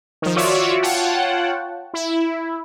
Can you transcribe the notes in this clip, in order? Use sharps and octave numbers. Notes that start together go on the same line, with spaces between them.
D#3 F3
F4 F#4 C#5 D5 E5
F4 C#5 F#5 G5 A5
E4